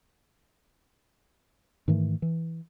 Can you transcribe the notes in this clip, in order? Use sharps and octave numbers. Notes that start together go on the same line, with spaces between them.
G#2 D#3 E3 A3
E3